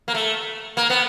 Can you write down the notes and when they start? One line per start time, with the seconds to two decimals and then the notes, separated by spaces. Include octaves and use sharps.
0.08 A#3
0.14 A3
0.77 A#3
0.90 B3